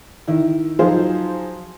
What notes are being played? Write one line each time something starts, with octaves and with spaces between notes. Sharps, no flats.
D#3 E4
F3 F#3 D#4 F4 G#4 C5